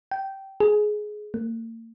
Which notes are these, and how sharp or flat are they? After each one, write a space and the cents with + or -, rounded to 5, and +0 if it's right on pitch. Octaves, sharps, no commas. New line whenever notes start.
G5 -15
G#4 +15
A#3 -40